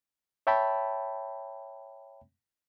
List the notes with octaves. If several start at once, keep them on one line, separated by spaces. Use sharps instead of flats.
C#5 E5 G5 A5 B5